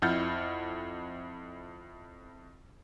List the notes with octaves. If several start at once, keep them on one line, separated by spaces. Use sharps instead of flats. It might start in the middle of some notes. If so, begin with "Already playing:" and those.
F2 E4 F#5 F6 G6 A6